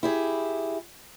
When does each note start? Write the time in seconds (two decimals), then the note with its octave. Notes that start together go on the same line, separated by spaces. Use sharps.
0.03 E4 G4 G#4